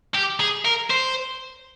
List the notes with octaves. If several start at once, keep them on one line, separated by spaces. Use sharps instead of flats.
G4
G#4
A#4
C5